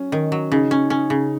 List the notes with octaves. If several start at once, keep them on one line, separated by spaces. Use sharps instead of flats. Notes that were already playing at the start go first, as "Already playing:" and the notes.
Already playing: F#3 C#4
D#3
F#3
C#3 D#4
C#4
C#4
C#3